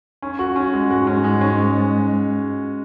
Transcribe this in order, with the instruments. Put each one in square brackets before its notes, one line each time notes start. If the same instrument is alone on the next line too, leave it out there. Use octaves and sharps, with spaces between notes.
[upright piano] C#4
F#4
C#4
G#3
[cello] G#2 [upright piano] F#4
[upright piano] C#4
G#3
C#4